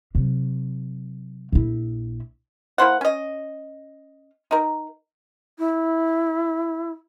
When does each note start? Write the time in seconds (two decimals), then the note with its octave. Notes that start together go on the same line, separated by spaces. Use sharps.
0.15 C3 F#3
1.52 A#1 E4
2.78 A#3 E4 C5 F#5
3.01 C#4 D#5
4.51 D#4 A#4
5.59 E4